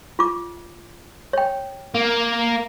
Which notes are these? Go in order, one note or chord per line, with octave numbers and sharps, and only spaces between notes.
F4 D6
C#5 G5
A#3